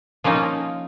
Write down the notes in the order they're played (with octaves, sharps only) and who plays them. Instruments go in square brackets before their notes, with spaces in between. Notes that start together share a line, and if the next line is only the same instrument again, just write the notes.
[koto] F3 A#3 C#4 D#4 F4